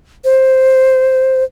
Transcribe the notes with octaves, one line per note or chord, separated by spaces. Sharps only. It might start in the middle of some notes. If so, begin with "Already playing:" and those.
C5